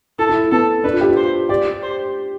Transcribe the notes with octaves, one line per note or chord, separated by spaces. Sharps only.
E4 A4
E4
B3 A4
D4 B4
F4
G4
F4
C5
G4 D5
C5